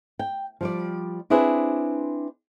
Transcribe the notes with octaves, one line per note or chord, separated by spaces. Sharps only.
G5
F3 G3 D5
C4 D4 E4 G#4 B4 C5